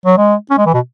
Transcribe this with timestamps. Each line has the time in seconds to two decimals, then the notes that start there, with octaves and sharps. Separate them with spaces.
0.06 F#3
0.18 G#3
0.51 C#4
0.58 G#3
0.66 E3
0.74 B2